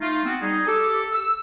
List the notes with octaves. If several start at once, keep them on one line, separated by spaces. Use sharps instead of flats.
A3 D#4 F4
B3 C4 F#4
G3 D#4 G#4
G4 A4
E6